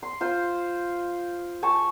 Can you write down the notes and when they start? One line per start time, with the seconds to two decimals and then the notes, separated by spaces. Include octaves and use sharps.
0.03 C6
0.21 F4 C5
1.63 G#5 A5 C#6